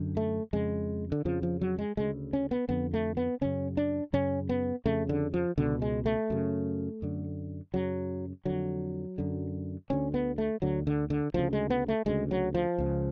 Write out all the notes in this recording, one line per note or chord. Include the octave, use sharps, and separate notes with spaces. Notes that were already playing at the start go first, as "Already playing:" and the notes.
Already playing: F#2 D3
A3
F2 C#3 G#3
D3
F2 C#3 F3
F3
F#3
G#3
D2 C#3 G#3
C#4
B3
F2 D3 B3
A3
B3
F#2 C#3 C#4
D4
F#2 C#3 C#4
B3
F2 C#3 A3
D3
F3
C#2 B2 D3
G#3
A3
F#2 C#3
F#2 D3
F#2 C#3 F#3
F2 D3 F#3
F#2 D3
D2 D3 C#4
B3
A3
D2 D3 F#3
D3
D3
D2 C#3 F3
G#3
B3
A3
D2 C#3 G#3
F#3
F3
C#2 C#3